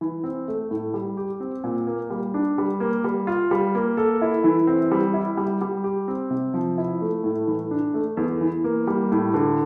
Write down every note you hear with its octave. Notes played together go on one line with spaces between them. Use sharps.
E3
C4
A3
A2
G3
G4
C4
A#2
A#3
G3
D4
G3
A#3
G3
F4
G3
A#3
A4
E4
E3
C4
G3
E4
G3
G3
G4
C4
C3
F3
E4
A3
A2
E3
D4
A3
E2
E3
A#3
G3
A2
D3